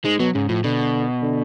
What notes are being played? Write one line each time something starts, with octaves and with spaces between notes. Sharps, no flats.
G#2 G#3
B2 F#3
G#2 C#3
A2 F3
B2 D3
D3